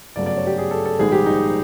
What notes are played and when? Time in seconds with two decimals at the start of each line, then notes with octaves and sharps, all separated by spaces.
0.16 G1 F#2 C#3 F#3 A3 D5
0.26 D5
0.37 C#5
0.47 G4
0.58 G#4
0.71 A4
0.85 A4
0.99 A#1 G#2 D#3 G3 G#4
1.12 G4
1.26 D#4